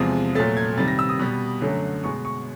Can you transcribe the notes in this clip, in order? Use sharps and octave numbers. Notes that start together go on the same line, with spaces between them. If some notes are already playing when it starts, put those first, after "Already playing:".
Already playing: E2 C3 F3 G#3
A#2 F#3 A3 A6
G#6
C3 D#3 G3 A6
A#6
E6
D#6
B2 G3
F#2 D3 F#3 A3
B2 G#3 C#6
C#6